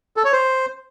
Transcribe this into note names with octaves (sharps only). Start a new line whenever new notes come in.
A4
C#5
C5